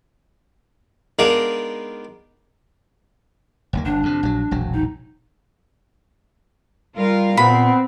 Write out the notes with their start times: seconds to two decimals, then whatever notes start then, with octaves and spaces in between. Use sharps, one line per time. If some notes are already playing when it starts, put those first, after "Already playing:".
1.19 G#3 B3 D4 D#4 A#4 F5
3.73 F#1 D#2 A#3
3.85 G1 D4
4.03 F2 C3
4.23 A#1 F#3
4.51 E1 A#1 F#3
4.74 D#4
6.97 G3 F4 A#4 F5
7.37 A#2 B3 C4 B5